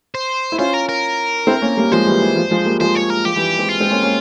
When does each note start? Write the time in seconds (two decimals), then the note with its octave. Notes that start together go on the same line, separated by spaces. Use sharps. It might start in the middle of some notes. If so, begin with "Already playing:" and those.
0.15 C5
0.52 E4
0.58 C#4 F4 C5
0.74 A#4
0.89 A#4
1.47 C4 E4
1.62 A#3 C#4
1.77 G3 A#3
1.92 F3 G#3 C5
2.07 E3 G3
2.22 E3
2.36 F3
2.51 F3 G#3
2.66 G3 A#3
2.80 F3 G#3 C5
2.95 C#5
3.10 A#4
3.25 F3 G4
3.36 E3 G3
3.58 G#3 C4
3.69 F4
3.80 G#3 C4
3.91 A#3 C#4
4.03 A#3 C#4